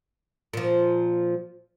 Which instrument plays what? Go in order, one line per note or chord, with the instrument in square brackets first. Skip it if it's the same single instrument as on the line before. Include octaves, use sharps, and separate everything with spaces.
[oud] A#2 F3